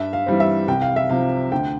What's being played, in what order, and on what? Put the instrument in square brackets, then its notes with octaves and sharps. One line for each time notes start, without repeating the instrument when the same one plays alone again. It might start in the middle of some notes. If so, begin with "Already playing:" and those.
Already playing: [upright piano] G2 E5
F5
E3 G3 C4
E5
C2 G5
F5
E5
C3 F3 F5
D2 G5